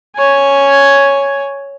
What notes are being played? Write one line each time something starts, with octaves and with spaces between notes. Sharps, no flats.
C#5 G#5